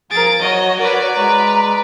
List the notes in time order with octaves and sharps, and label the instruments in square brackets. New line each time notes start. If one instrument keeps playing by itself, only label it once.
[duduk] F3 [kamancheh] G#4 A#4 [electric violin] A6 D7
[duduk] F#3 [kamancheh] F#4 C#5 [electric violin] D#5
[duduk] A#4 [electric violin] B4 D5
[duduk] G#3 [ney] A#5